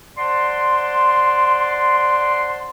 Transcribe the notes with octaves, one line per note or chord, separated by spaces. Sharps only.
C5 D5 F#5 A5 C6